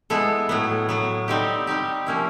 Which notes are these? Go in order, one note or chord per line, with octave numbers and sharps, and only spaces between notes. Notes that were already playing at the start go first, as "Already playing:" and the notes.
G#3 B3 E4 A4
A2 F#3 B3
A2 F#3 B3
G3 C4 D#4 G4
G3 C4 D#4 G4
F3 A#3 C#4 E4